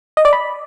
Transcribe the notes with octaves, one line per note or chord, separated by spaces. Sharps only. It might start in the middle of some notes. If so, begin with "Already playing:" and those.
D#5
D5
B5